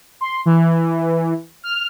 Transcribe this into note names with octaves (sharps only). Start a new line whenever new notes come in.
C6
E3
F6